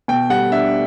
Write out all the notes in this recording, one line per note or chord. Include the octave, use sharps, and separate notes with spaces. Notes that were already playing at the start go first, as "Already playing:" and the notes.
B2 G5
G3 F#5
D4 E5